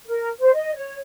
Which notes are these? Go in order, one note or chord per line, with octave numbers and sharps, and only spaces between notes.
A#4
C5
D#5
C#5